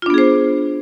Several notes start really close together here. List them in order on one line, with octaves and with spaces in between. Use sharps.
F4 D4 B3 G#4 C5